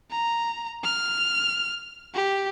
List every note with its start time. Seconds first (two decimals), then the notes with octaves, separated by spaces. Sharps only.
0.11 A#5
0.84 F6
2.14 G4